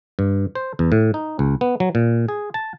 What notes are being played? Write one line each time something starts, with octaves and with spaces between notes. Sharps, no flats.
G2
C5
E2
A2
D#4
C#2
B3
F#3
A#2
G#4
A5